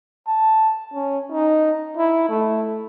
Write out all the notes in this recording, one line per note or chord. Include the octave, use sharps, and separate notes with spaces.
A5
C#4
D#4
E4
A3